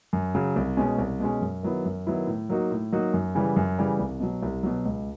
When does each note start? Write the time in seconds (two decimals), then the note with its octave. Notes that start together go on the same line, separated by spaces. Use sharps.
0.13 F#2
0.35 C#3 F#3
0.56 C2
0.77 B2 G#3 C#4
0.98 C2
1.20 B2 G#3 C#4
1.41 F#2
1.63 D#3 F#3 B3 E4
1.85 F#2
2.07 D#3 F#3 B3 E4
2.27 A2
2.49 F#3 A#3 D#4 F#4
2.71 A2
2.92 F#3 A#3 D#4 F#4
3.14 F#2
3.35 C#3 E3 G3
3.56 F#2
3.79 C#3 E3 G3
3.99 C2
4.20 B2 F#3
4.43 C2
4.63 B2 F#3
4.86 C#2